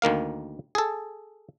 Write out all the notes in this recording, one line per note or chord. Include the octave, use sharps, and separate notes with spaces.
D2 D#3 A#3 F5
G#4 A4